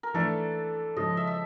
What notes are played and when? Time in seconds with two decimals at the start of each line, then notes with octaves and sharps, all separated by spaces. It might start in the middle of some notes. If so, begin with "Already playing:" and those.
0.03 A#4
0.14 E3 A3 D4 A4
0.96 C#3 F3 G#3 D#5
1.17 E5
1.27 E5